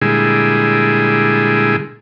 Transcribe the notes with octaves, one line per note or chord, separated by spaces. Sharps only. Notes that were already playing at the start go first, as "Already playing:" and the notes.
A#2 D3 G3 G#3 E4 G#4